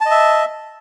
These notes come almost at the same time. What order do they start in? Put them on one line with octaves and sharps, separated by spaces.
A5 D#5 E5